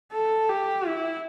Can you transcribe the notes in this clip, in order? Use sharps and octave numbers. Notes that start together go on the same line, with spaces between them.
A4
G4
E4